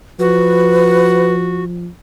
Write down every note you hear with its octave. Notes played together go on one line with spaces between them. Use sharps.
F3 F#4 B4